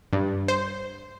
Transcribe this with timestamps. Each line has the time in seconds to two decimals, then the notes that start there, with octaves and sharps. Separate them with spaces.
0.13 G2
0.48 C5